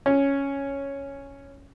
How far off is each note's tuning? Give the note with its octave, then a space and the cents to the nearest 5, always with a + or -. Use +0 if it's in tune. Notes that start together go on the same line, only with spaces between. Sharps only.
C#4 +0